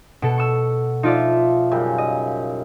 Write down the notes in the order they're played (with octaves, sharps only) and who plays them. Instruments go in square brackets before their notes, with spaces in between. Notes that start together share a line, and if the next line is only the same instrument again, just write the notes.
[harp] B2 A4 [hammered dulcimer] F#5
[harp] C#6 E6
[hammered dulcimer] F3 E5 [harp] D#4 F4 D5
[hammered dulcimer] F#2 C#3 G3
[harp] D#5